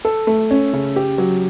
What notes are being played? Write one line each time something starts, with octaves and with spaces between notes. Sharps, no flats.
A4
A3
C#4
C#3
G4
F#3